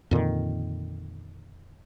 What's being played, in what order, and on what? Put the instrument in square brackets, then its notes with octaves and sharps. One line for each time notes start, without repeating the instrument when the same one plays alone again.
[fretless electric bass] F2 A#2 D3 D#3